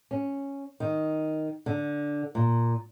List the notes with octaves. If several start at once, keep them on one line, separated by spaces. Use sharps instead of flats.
C#4
D#3
D3
A#2